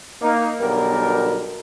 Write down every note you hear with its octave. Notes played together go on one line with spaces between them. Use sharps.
A#3 D#4
B1 B2 D3 G3 A#4